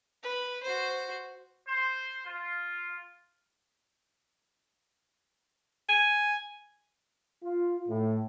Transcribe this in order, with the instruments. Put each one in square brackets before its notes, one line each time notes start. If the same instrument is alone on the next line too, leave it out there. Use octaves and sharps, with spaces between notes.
[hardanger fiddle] B4
F#4 C5
[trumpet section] C5
F4
[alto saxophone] G#5
[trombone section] F4
A2